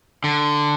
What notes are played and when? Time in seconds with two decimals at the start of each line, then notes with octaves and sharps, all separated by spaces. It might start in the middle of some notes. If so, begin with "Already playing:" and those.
0.24 D3